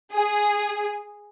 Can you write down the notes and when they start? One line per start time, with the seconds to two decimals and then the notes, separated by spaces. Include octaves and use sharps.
0.13 G#4